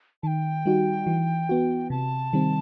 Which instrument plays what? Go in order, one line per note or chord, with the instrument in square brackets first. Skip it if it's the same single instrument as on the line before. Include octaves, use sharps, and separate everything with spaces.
[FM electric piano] D#3 [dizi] G5 A5
[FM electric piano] G3 D#4 F#4
E3
B3 F#4
[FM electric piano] C3 [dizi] A5
[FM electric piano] D#3 G3 C4